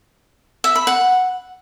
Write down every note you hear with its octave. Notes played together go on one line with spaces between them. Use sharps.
E5
B5
F#5